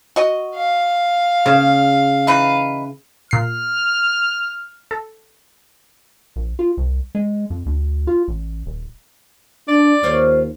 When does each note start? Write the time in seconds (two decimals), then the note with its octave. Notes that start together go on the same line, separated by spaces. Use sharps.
0.16 F#4 D#5
0.55 F5
1.46 C#3
2.27 E3 D#4 B4
3.31 A#2 F6 C7
4.91 A4
6.36 A#1
6.59 F4
6.77 C2
7.15 G#3
7.50 F2
7.66 D2
8.07 F4
8.28 A1
8.66 D#1
9.68 D4 D5
10.03 D#2 F4 C5 C#5